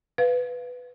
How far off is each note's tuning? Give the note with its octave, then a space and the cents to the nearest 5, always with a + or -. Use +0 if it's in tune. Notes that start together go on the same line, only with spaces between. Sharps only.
B4 +5 F5 +0